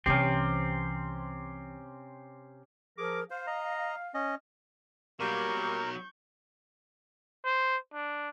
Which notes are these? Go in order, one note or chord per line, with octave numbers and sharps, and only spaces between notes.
C2 C3 E3 C4 C#4 G4
F3 G#4 A#4 D6
C5 F5
D#5 A#5
C#4 D#5
B2 F#3 G3 A#3 A#4 C#6 G6
C5
D4